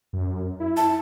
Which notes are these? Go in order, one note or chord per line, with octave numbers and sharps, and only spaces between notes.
F#2
E4
A5